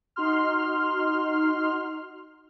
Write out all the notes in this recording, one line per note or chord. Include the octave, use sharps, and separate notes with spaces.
D#4 F#4 C6 F6